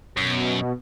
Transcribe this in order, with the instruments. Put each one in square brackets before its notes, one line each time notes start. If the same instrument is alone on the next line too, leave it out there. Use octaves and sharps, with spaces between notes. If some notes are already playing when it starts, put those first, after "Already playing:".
[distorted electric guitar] F#2 [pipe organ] B2